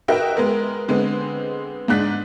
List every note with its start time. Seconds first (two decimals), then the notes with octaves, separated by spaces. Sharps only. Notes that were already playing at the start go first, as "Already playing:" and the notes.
0.08 F#4 A#4 B4 D#5 E5 G5
0.37 G#3 B3 A#4
0.88 D3 G#3 B3 C4
1.88 G#2 G#3 D4 F#6 B6